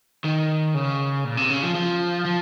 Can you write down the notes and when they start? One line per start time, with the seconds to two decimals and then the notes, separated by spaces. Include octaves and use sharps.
0.24 D#3
0.74 C#3
1.24 A#2
1.37 C3
1.49 C#3
1.63 F3
1.75 F3
2.25 F3